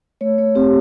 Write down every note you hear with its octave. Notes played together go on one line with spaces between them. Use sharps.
A3 C#5
A3 C#5
C4 G4